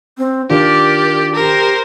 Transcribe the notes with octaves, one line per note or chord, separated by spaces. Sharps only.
C4
D#3 D4 F4 G4 A#4 D5
G4 A#4 C5